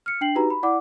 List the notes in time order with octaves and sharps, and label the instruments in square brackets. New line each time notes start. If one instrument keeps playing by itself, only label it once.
[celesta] F6 C#7
D4 G5 C7 F#7
D#4 F#4 G4 B4 A#5
B5
E4 D5 F#5 D6